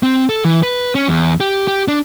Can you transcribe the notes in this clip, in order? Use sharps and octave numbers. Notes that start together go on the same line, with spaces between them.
C4
A4
E3
B4
C#4
E2
G4
G4
D4